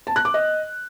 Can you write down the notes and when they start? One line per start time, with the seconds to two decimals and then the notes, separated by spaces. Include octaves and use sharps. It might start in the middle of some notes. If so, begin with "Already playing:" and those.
0.07 A5
0.16 F#6
0.25 D6
0.34 D#5